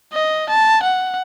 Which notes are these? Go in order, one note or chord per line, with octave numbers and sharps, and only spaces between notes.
D#5
A5
F#5